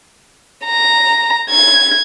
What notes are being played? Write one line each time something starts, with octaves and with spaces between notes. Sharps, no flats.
A#5
G#6